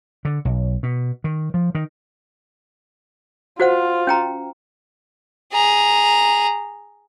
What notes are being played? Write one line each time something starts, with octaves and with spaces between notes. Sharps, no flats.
D3
B1
B2
D#3
F3
D#3
F4 F#4 C5 F#5
C#4 G5 A#5
G#4 A#5